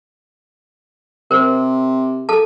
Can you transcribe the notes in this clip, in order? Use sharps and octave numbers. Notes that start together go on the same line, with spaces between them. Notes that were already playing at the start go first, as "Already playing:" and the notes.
C3 A#4 C5
A4 A5